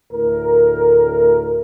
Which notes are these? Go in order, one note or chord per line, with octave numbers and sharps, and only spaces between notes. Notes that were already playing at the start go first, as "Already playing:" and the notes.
D2 A2 A#4